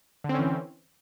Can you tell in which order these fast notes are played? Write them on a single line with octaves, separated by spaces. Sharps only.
D3 C4 C#4 E3